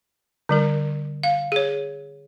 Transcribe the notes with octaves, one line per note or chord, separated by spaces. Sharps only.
D3 G3 A#4
F5
G#4 C#5